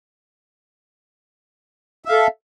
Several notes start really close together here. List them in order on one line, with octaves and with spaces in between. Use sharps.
E5 F5 A4